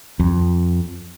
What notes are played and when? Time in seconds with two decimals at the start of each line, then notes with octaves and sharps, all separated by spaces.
0.20 F2